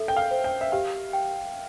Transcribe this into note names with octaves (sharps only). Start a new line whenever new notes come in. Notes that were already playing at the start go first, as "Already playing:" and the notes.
Already playing: A4 E5
G5
F5
C5
G5
E5
G4 F5
G5